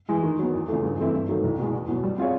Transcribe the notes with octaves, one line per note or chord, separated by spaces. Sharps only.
E3 G#3
D#3
F#3 B3
E2
C#3 F3 A3
G2
E3 A3 C4 E4
G2
D#3 F#3 A3
C2
B2 G#3
E2
B2 F#3 B3
G3
C4 F4 G#4 C#5